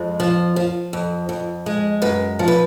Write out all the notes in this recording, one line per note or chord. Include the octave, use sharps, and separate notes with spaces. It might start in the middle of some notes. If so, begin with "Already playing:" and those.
Already playing: F2 G#3
F3
F3
F2
F2
G#3
F#2 B4
F3
B4